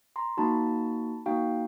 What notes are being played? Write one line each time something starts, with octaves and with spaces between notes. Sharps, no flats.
A#5 C6
A#3 D#4 F#4 A5 B5
A#3 D#4 F#4 F5 G5